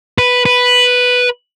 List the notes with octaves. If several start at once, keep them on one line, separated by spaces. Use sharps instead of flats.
B4
B4